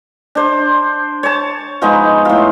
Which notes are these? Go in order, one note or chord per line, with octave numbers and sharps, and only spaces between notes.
D4 C5
C#5 A5
F3 G#3 B3 D#4
A2 F4